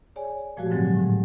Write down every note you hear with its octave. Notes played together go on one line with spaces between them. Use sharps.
G#4 C#5 D5 G#5
A#2 F3 G#3 A3 F#4 G4
G#2 D3 F3 F#3 G#3 C4
A2